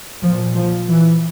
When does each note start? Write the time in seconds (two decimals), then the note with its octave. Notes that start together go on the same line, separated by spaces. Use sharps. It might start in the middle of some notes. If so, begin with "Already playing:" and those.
0.22 A#2 F3
0.56 F3
0.89 E3